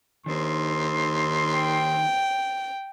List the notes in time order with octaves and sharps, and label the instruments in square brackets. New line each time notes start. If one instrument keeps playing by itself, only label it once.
[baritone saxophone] D#2 [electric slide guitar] D#3 D4 C5 [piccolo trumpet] C6
[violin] G5